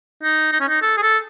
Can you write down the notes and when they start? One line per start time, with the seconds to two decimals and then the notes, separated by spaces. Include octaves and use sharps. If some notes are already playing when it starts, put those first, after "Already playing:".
0.23 D#4
0.52 D#4
0.61 C#4
0.68 D#4
0.82 A4
0.97 G#4
1.02 A4